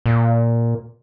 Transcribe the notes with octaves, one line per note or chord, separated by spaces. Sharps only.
A#2